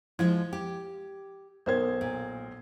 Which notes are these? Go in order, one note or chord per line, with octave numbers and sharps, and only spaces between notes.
F3 G#3 E4 F4 F5 G#6
G4
B1 A#4 C5 G#6
A#2